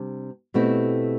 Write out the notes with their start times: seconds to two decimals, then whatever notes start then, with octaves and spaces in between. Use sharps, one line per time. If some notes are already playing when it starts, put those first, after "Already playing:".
Already playing: C3 G3 D4
0.54 B2 A3 C4 E4 G4